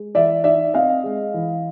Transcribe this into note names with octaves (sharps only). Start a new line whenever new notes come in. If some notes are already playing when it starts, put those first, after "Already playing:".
Already playing: G#3
E3 D5 E5
D#4 D5 E5
C4 D#5 F5
G#3
E3